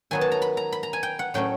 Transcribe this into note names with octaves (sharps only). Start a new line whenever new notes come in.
D#3 F#3 B3 G#5
A5
A#5
B5
A#5
B5
A#5
G#5
G5
F#5
A2 F#3 A3 C#4 G5